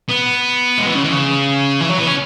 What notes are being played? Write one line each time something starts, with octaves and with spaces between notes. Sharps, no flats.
B3
G#3
E3
C#3
E3
C#3
E3
F#3
B3
C#4